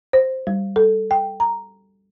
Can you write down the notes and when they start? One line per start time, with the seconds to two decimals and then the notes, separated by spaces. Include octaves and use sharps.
0.13 C5
0.47 G3
0.76 A4
1.11 G5
1.40 A#5